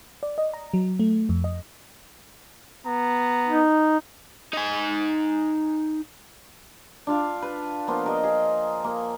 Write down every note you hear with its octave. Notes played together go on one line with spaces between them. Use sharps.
D5
D#5
A#5
F#3
A3
F2
D#5
B3 A#5
D#4
D#4 G#5
D4 F4 F5
B4
F3 A#3 B3 F4
A#4 D#5
G#4
A#3